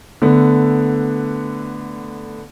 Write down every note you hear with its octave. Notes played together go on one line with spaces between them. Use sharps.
D3 A3 B3